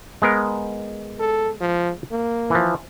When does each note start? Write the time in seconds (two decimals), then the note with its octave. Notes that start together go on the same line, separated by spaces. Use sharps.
0.22 G#3 B3 A#4
1.20 A4
1.61 F3
2.12 A#3
2.50 E3 F3